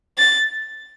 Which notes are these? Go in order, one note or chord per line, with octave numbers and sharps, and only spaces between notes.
A6